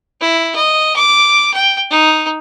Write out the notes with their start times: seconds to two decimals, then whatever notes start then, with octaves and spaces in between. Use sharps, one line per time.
0.21 E4
0.55 D#5
0.96 D6
1.54 G5
1.90 D#4